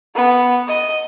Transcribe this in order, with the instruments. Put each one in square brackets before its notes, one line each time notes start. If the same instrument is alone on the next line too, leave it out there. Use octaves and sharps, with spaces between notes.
[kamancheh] B3
D#5